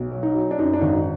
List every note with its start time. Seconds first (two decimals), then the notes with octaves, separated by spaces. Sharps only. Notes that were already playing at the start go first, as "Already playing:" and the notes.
Already playing: B1
0.11 F#3
0.23 D#4
0.35 F#3
0.51 D4
0.59 F#2 D#4
0.73 D4
0.81 G#1 D#4